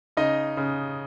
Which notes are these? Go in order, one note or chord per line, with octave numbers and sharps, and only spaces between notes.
C#3 D#4 D#5
C#3